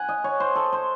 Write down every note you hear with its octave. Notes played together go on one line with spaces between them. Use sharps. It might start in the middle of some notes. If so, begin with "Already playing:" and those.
Already playing: F#5 G#5
D#5
C#5
C5
A4
C5